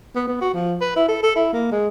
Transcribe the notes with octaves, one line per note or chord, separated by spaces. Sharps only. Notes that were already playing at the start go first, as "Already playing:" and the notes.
B3
B3
F#4
F3
B4
E4
A4
A4
E4
A#3
G#3